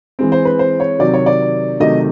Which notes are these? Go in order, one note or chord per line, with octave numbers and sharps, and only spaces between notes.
E3 G#3 C4
C5
B4
C5
C#5
C3 D#3 F#3 D5
C#5
D5
C3 D#3 F#3 A3 D#5